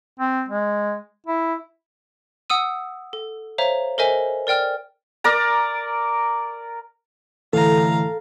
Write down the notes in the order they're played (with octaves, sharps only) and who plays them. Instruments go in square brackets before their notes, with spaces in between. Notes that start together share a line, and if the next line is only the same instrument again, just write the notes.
[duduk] C4
G#3
E4
[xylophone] F#5 D#6 E6 D#7
A4
C5 C#5 E5 F5 A#5
A4 A#4 C5 D#5 E5 G#5
A#4 D5 G5 F6
[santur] A#4 D5 A#5
[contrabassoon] A2 [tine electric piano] D3 E3 [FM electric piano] A4 [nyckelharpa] F5 A#5